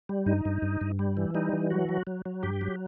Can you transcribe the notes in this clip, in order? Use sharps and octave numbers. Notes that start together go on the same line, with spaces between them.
G3
G2 D#4
G2
G2
G2
G3
E3
G3 D#4
E3
F#3 F#4
F#3
F#3
F#3
G2 G4
F#3